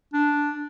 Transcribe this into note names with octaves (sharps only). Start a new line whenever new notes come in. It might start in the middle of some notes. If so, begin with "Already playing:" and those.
D4